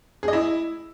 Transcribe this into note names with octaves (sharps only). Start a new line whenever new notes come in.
G#4
D#5
E4